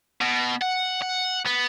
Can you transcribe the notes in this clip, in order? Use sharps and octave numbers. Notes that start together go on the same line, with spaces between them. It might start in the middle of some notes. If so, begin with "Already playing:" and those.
B2
F#5
F#5
B3